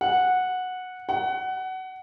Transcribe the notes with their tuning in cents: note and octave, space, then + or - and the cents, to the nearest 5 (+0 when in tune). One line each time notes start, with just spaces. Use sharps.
F#5 -10
F#5 +20